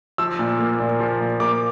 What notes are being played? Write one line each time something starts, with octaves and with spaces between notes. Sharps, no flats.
F3 E6
A#2
A#3
A#2
F3
A#2
A#3 D6